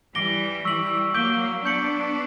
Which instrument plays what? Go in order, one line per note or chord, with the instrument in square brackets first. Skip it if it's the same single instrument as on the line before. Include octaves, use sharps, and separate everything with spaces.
[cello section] E3 G3 [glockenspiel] D6 A#6 D7 G7
[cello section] E3 G3 [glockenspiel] C#6 E6 B6 F#7
[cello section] F#3 A#3 [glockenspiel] D6 G6 B6 D7 G7
[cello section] B3 D4 [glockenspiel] C#6 G6 C#7 F#7